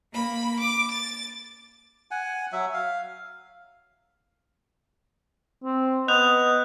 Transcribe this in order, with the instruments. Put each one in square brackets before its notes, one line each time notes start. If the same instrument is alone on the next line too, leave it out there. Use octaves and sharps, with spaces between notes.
[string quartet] A#3 B5
D6
A6
[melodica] F#5 G#5
F#3 E5
F5
[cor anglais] C4
[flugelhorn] B3 [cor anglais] D#5 [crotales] F#6 G6 F7